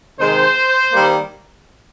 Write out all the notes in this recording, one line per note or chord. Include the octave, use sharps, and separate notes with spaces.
C3 D#3 G#3 C5
D#3 G3 A#3